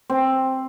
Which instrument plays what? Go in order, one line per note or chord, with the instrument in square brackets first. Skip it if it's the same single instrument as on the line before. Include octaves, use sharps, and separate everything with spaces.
[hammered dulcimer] C4